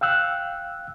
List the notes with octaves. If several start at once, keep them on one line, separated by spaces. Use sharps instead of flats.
F5 G5 E6 F#6